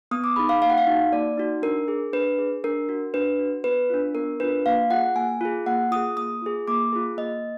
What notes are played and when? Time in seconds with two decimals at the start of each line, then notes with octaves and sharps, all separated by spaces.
0.11 B3 D#6
0.24 D6
0.36 D#4 G#4 B5
0.49 F5
0.62 A#3 F5
0.70 F#5
0.78 F5
0.87 D#4 F#4
1.12 A#3 D5
1.37 D#4 F#4
1.62 D4 A#4
1.88 G#4
2.13 D4 B4
2.39 G#4
2.64 D4 A#4
2.89 F#4
3.14 D4 B4
3.39 F#4
3.64 B3 B4
3.90 D4 F4
4.15 B3 A#4
4.40 D4 F4 B4
4.66 A#3 F5
4.90 F4 G#4 F#5
5.16 A#3 G#5
5.41 F4 G#4
5.66 A#3 F#5
5.91 F4 G#4 D#6
6.17 A#3 D#6
6.42 F4 G#4
6.68 A#3 D6
6.93 F4 G#4
7.17 A#3 D#5